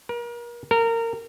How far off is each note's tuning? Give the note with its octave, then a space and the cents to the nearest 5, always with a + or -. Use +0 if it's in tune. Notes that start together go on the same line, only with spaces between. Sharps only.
A#4 +35
A#4 -25